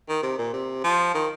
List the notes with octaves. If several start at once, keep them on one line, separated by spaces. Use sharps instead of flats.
D#3
C3
A#2
C3
F3
D#3